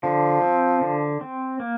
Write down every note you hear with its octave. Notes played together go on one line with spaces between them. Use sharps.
D3 F3
C4
D3
C4
A#3